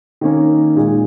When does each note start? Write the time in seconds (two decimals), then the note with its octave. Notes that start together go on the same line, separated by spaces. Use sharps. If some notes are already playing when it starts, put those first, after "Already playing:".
0.21 D#3 A#3 C#4
0.76 A#2 G#3 D#4